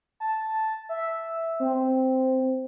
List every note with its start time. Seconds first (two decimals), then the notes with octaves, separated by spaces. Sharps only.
0.20 A5
0.89 E5
1.60 C4